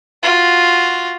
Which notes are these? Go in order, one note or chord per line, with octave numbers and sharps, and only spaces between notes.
F4 F#4